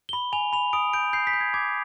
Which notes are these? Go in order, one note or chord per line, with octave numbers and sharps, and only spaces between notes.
G7
B5
G#5 F7
B5 F7
D#6 D7
G6 D7
G6 C7
B6
G6
G#6
D6 G#6